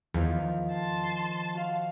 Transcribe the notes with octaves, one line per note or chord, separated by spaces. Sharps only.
E2 D#3 F3
A5 C6
F#4 F5